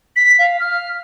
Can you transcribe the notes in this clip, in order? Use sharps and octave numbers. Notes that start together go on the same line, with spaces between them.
B6
F5
F6